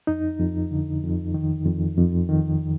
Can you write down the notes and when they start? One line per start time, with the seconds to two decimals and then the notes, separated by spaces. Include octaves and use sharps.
0.07 F2 D#4
0.39 F2
0.71 D3
1.03 F2
1.34 D#3
1.66 F2
1.98 F2
2.29 D#3